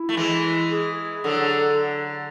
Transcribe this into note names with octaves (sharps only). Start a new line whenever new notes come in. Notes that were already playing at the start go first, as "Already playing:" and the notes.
Already playing: E4
A3
E3 G#3
G#4
D3 F#3 A4